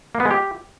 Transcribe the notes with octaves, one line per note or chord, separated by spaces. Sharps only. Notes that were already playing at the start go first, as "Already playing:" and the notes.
A#3
B3
G#3
G4